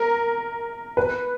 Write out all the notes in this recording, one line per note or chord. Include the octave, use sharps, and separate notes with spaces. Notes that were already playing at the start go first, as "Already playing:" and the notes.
Already playing: A#4
B4